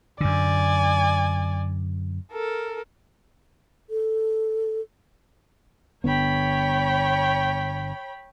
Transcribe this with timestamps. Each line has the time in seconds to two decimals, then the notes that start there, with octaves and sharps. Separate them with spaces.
0.21 F#2 D3 D5 G#5
2.33 A4 A#4
3.90 A4
6.04 G1 D3 B3 C#5 G5 B5